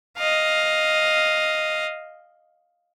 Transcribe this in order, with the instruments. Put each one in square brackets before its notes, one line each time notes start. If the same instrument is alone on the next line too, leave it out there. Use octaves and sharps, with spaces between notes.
[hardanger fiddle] D#5 F5